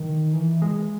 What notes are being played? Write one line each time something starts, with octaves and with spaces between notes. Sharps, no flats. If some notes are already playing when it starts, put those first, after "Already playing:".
Already playing: D#3
E3
G#3